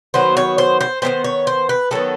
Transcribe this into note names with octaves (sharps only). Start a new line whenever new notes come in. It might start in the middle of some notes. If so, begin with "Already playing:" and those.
D#3 F#3 B3 C5
C#5
C5
C5
D#3 F#3 B3 C5
C#5
C5
B4
D#3 F#3 B3 A4